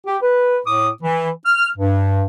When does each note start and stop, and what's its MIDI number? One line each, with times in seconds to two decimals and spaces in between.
0.06 0.16 67
0.23 0.59 71
0.67 0.89 45
0.67 0.89 86
0.67 0.89 87
1.03 1.29 52
1.45 1.68 89
1.77 2.24 43